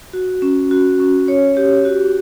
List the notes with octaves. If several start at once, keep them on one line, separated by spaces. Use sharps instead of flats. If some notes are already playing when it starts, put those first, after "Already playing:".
F#4
C#4
F#4
C#4
C#5
G4
F#4